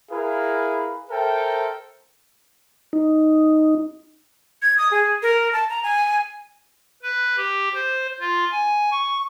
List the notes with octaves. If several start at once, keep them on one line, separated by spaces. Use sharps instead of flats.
E4 G#4 A#4 B4 F5
A4 A#4 C5 E5 G5
D#4
G#6
D#6
G#4
A#4
A5
A#5
G#5
B4
G4
C5
F4
G#5
C#6